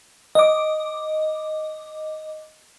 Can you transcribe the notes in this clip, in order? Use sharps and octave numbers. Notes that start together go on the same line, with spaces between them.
D#5 D6